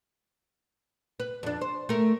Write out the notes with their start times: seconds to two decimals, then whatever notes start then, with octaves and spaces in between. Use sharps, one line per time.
1.20 B4
1.43 F2 D4
1.61 C5
1.89 A3 A#4